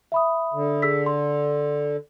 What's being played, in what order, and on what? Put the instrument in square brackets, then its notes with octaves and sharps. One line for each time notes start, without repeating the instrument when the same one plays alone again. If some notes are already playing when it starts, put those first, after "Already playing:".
[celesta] E5 B5 D#6
[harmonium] D3
[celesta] G#4 E6 B6
C6